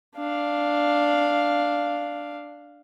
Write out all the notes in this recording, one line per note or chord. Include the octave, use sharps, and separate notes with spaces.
D4 F5